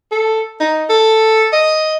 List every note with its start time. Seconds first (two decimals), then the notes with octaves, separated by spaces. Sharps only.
0.12 A4
0.60 D#4
0.89 A4
1.53 D#5